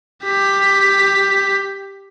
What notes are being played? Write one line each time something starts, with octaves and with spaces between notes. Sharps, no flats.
G4 B6